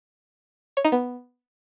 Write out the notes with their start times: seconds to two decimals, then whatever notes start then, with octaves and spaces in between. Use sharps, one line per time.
0.77 C#5
0.85 D#4
0.92 B3